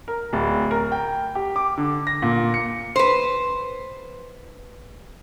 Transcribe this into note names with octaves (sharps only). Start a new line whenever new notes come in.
A#4
D1
A#4
G5
G4
D6
D3
A#6
A#2
C#7
B4 C5